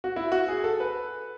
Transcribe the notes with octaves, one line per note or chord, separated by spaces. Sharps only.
F#4
E4
F#4
G#4
A4
B4